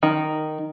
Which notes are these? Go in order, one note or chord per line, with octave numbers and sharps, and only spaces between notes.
D#3